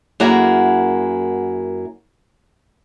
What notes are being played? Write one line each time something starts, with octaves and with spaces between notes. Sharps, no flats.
F#2 A#3 E4 F#4 G#4 A#5